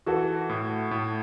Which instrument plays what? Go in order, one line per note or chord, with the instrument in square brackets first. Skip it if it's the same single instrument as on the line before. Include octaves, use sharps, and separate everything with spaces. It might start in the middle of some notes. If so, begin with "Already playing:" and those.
[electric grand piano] E3 [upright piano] F#4 A4
[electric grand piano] A2
A2